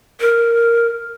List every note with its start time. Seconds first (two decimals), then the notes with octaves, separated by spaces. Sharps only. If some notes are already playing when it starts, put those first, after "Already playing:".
0.20 A#4